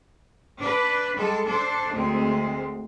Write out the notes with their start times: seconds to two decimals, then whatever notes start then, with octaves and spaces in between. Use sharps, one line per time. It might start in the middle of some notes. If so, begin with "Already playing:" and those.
0.59 D4 B4
1.17 G3 G#3 A4
1.46 D4 A4 C5
1.92 D2 G#3 C4